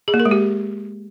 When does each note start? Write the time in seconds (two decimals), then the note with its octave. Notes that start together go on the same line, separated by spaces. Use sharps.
0.08 G#4
0.14 A#3
0.20 A#4
0.25 G#3
0.31 G4